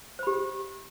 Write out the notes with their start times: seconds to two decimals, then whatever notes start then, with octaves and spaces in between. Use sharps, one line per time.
0.19 C5
0.23 B5
0.27 G4